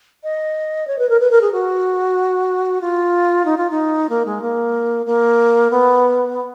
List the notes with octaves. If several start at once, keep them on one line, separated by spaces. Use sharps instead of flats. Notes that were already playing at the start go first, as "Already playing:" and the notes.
D#5
C#5
B4
A#4
B4
A#4
G#4
F#4
F4
D#4
F4
D#4
A#3
G#3
A#3
A#3
B3